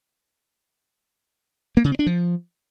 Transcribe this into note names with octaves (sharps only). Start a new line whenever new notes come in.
A#3
C#3
C4
D4
F3